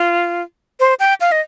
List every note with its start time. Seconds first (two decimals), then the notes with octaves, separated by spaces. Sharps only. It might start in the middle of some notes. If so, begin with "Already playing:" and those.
Already playing: F4
0.80 C5
1.00 G5
1.21 F5
1.32 D#5